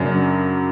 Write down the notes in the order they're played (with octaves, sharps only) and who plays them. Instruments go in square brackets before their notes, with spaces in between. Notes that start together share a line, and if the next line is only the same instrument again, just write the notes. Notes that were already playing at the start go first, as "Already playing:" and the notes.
Already playing: [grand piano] F#2 C#3 F#3 A#3 D4